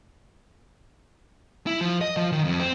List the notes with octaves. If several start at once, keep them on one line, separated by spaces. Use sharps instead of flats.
E4
F3
D#5
F3
D#3
F2
C4